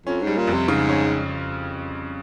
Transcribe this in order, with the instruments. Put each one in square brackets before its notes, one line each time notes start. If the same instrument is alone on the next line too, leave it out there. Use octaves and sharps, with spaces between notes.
[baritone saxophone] F2 [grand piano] C#4
[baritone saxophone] G#2
[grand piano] G3
[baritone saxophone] A#2
[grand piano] F2
[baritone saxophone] C3
[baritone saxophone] G#2 [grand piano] C#3
[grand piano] C#4